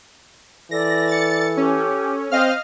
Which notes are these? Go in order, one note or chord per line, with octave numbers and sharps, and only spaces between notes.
E3 A4 D5 A#6
A6 C#7
C#4 G4
C4 C5 D#5 F5 F6